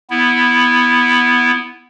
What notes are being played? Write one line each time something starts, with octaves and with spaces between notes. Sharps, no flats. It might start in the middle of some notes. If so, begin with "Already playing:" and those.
B3 E4